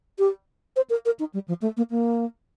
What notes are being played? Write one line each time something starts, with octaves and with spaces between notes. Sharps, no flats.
G4
C5
A#4
A#4
D#4
G3
F3
A3
A#3
A#3